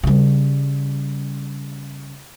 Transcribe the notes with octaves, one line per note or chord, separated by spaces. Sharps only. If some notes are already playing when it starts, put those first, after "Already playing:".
C#3 G3